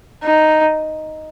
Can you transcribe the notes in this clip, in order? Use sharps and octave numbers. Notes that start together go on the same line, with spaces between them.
D#4